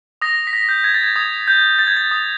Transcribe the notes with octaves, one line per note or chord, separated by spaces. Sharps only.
D#6 A#6
B6
A#6
G6
G#6
A6
G#6
D#6 G#6
G6
G6
A6
G#6
A6
D#6